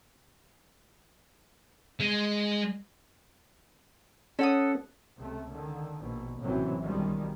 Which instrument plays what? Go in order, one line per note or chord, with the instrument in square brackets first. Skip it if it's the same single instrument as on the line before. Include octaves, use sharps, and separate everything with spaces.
[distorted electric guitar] G#3
[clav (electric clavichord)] C#4 [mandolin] A4 F#5 D#6
[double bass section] C#2 C3 A3
D3 D#3
A#1 B2
A1 F#2 C3 E3 F#3
B1 D#3 F3 G3 G#3